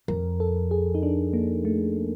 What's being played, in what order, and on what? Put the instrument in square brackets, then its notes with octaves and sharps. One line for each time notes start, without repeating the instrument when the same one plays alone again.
[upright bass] F2 [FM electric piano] A#4
[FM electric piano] A4
G#4
D#4
D4
A#3
A3